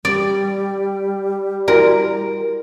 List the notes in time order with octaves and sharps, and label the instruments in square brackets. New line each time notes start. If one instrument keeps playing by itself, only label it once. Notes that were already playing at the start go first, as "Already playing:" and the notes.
[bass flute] G3 [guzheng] D5
[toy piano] E4 F#4 D5 [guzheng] A#4